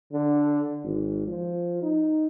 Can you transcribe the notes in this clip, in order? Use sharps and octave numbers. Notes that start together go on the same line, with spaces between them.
D3
G#1
F3
D#4